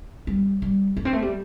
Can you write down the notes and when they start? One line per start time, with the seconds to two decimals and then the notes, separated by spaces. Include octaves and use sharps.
0.27 G3
0.62 G3
0.97 A3
1.05 C4
1.13 A3
1.22 G3